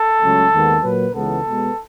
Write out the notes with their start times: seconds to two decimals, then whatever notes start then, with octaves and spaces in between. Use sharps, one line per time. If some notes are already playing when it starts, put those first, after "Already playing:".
Already playing: A4
0.21 C#2 C#3 F#3 A3
0.51 D#2 D#3 G#3 B3
0.82 A#2 F#3 A#3 B4
1.14 C#2 C#3 E3 G#3 B3 A4
1.45 B2 G#3 B3